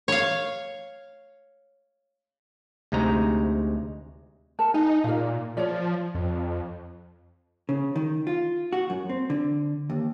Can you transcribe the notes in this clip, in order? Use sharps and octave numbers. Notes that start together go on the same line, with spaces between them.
C#5 F5
D2 C3 G#3 D#4 A#5
A#4 A5
D#4 G#5
A#2 A#4 F5
F3 C#5 D5
F2
C#3
D#3
F4
F#4
F#2
C4
D3
D#2